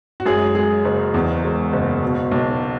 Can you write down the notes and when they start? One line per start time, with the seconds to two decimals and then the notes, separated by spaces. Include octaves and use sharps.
0.20 F#4
0.26 F#2 G#3 G#4
0.55 F#3 G#3 G#4
0.85 F#1
1.14 E2
1.44 G#3
1.73 F#1
2.02 B2
2.31 B1